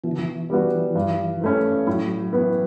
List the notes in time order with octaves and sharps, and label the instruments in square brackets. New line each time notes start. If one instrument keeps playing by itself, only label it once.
[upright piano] B2 [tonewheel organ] E3
[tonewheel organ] D3
E3
[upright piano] G3 B3 D4 F#4
G2
E3 A3 C#4
[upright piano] A2 [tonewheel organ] F#3
[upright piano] E3 B3